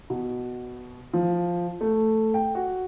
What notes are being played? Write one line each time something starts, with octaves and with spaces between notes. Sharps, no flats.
B2
F3
A3
G5
F#4